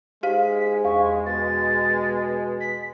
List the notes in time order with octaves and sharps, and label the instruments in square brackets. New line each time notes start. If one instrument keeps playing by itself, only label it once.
[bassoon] G#2 [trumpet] G#3 [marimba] G4 F5 [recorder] B6
[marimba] E2 [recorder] C#6
[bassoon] B2 [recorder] A6
[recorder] B6